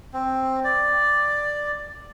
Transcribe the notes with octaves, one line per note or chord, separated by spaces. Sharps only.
C4
D5